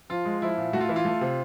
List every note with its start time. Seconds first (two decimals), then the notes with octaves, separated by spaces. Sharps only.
0.09 F3 F4
0.25 G#3
0.42 F3 E4
0.57 A#2
0.73 A3 F#4
0.80 F4
0.89 E3 E4
0.96 F4
1.05 A3
1.21 C3